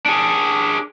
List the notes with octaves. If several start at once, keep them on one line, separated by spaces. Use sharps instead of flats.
D4 G#4